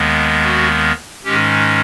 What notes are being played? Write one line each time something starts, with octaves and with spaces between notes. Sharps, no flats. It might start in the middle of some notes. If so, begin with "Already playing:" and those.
Already playing: D#2 D#3 G#3 B3
F#4
G#2 D#3 G#3 C#4 G4